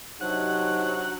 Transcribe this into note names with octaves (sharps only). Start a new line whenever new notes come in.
C3 F#3 D4 D#4 F#4 F#5